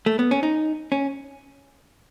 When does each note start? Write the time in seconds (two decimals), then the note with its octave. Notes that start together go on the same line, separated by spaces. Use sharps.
0.06 A3
0.19 B3
0.31 C#4
0.43 D#4
0.92 C#4